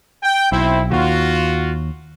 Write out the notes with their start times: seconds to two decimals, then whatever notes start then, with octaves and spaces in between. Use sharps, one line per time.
0.23 G5
0.52 B1 C4 E4
0.92 D#2 F4 F#4